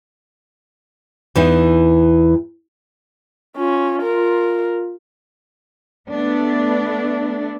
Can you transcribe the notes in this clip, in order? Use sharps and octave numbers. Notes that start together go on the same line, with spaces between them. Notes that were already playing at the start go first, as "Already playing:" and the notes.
E2 E3 D#4
C#4 F4
A#4
A3 B3 D4